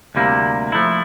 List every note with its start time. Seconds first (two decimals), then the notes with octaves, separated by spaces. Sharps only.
0.15 D2 C3 G3 A#3 E4
0.72 F3 A3 E4